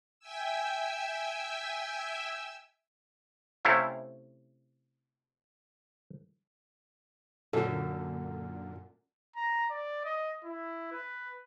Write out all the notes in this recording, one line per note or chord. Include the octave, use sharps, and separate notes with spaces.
E5 G5 G#5 E6
C3 A3 C#4 E4 F5
F#2 A#2 D3 A4
A#5
D5
D#5
E4
B4